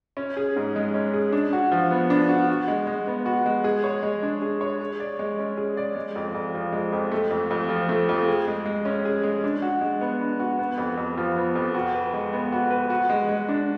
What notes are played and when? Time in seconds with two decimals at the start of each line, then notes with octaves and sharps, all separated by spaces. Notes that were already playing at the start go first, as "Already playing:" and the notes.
0.17 C#4
0.37 G#4
0.56 G#2
0.76 G#3
0.94 C#4
1.13 G#4
1.33 D4
1.53 F#4
1.72 F3
1.91 B3
2.10 D4
2.29 F#4
2.49 F#4
2.68 G#3
2.87 G#3
3.07 B3
3.26 F#4
3.46 G#3
3.64 G#4
3.84 C#5
4.03 G#3
4.23 D4
4.42 G#4
4.61 C#5
4.81 G#4
5.00 D5
5.19 G#3
5.39 C#4
5.57 G#4
5.77 D5
5.96 G#3
6.15 F2
6.34 F2
6.54 F3
6.72 G#3
6.92 F2
7.11 A3
7.30 F2
7.51 F2
7.69 F3
7.89 A3
8.09 F2
8.28 G#4
8.47 G#3
8.66 G#3
8.85 C#4
9.05 G#4
9.23 G#3
9.44 D4
9.62 F#4
9.81 G#3
10.01 B3
10.21 D4
10.40 F#4
10.59 B3
10.78 F2
10.97 F2
11.17 F3
11.36 B3
11.55 F2
11.74 F#4
11.95 B4
12.14 G#3
12.33 B3
12.52 F#4
12.71 B4
12.90 F#4
13.10 G#3
13.29 G#3
13.49 D4